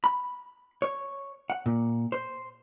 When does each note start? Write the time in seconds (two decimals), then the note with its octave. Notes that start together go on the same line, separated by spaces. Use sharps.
0.04 B5
0.82 C#5
1.50 F#5
1.66 A#2
2.12 C5